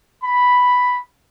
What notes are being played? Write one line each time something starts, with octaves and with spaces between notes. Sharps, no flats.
B5